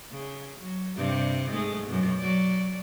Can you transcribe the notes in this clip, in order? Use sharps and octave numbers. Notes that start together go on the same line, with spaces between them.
C#3
F#3
G2 C3 G3
G#2 G#3 A3
F#2 B2
F#3 D5